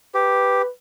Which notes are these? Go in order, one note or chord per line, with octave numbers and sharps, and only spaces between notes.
G4 B4